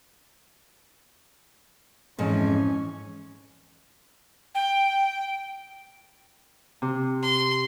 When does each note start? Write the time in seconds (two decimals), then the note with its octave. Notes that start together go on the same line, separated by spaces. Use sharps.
2.19 F2 G#2 E3 C#4
4.55 G5
6.82 C3
7.23 C6